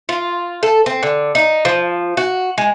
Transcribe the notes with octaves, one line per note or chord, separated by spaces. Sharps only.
F4
A4
C4
D3
D#4
F3
F#4
G#3